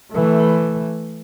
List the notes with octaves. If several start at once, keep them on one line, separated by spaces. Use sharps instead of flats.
E3 A3